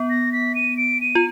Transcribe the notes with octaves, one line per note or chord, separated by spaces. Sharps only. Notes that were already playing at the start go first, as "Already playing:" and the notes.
Already playing: B3
A#6
B6
D#7
D7
D#7
F4